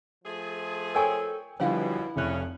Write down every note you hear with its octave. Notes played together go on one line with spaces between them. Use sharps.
F3 A3 G#4
A4 A#4 C#5 G5 G#5 C#6
F#2 B2 D3 F3 G3 E4 C#5 F5
F1 A2 C#3 C#4 E5 F#6